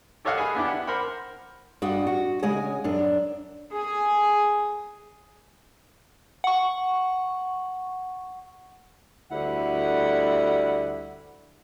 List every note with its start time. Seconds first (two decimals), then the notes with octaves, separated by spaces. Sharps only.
0.25 G4 A4 C#5 D#5 F5 F#5
0.38 G#4 G#5 B5
0.55 B3 D4 E4 G4
0.68 F#5
0.87 A#4 C5 F#5 B5
1.82 G2 D4 F#4 D#5 F#5
2.07 F#4
2.43 C#3 G#3 D#5 G#5
2.84 F#2 D4
3.72 G#4 G#5
6.44 F#5 C#6
9.31 D2 D3 G3 E4 F#5